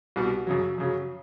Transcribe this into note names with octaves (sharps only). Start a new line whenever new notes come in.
C2 B2 G3
F#2 C#3 F#3
F#2 C#3 F#3